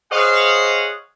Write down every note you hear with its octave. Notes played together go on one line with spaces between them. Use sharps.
G#4 C5 C#5 D#5 F5 F#5